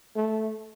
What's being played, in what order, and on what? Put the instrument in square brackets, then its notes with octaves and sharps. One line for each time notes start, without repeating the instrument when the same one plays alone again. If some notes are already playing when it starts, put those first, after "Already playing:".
[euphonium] A3